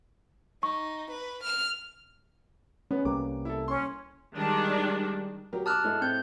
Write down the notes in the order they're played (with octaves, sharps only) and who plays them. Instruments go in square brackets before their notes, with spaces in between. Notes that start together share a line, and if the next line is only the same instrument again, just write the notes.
[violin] D#4 [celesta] C#6
[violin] B4
F6
[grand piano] B3 [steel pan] C#4 B4
[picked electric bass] C2 G3 A#3 [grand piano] D6
[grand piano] E4 A4
[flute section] C#4 [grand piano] C6 C#6
[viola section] D#3 D4 [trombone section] G3 G#3
[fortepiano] F#3 G4 A#4
[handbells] A5 F6 F#6 [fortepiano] D6 D#6
[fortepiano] A2 G#3
[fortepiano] A2 [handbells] C4 G6